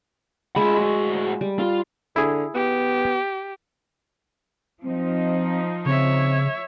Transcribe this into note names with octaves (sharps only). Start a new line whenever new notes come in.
G#3 F4 E5 B5
A2 F#4
G3
F4
D3 E4 G#4
B3 G4
F3 C4 D#4
C#3 C4 C#5 E5